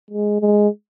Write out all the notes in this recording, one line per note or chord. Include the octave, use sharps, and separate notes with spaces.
G#3
G#3